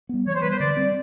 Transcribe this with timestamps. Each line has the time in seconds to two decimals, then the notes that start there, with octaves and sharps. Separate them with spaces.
0.09 G3 B3
0.26 E3 C#5
0.34 C5
0.42 G3 B3 B4
0.50 C5
0.59 D3 D5
0.77 G3 C4